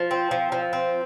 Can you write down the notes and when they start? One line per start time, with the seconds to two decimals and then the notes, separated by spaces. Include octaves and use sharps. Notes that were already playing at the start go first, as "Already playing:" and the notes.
Already playing: F3
0.11 C4
0.31 F3
0.52 F3
0.73 C4